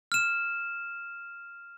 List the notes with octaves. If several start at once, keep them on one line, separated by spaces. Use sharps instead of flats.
F6 E7